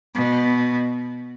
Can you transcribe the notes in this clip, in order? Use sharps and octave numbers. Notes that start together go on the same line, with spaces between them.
B2